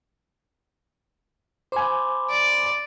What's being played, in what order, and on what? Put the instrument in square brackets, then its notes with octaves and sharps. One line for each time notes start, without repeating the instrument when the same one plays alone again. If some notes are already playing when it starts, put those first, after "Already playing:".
[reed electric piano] C5 G#5 [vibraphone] B5 C6 D6
[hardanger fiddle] D5